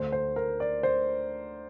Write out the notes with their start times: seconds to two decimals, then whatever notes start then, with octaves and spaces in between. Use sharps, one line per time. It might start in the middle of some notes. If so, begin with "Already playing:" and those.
Already playing: D2 D3 A3 C5
0.12 C5
0.36 A#4
0.60 D5
0.83 C5